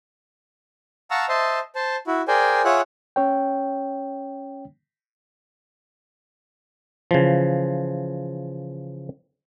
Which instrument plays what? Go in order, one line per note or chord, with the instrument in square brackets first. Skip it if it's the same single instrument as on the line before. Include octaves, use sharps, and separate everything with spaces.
[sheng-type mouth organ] F5 F#5 A5 A#5 C#6 E6
C5 D#5 E5 A5 C6
C5 A5
E4 F#4
G#4 A#4 C5 D5 G5 G#5
F4 G#4 C#5 E5 F#5 F#6
[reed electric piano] C#4 C#5 G5
[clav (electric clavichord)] C#3 E3 F3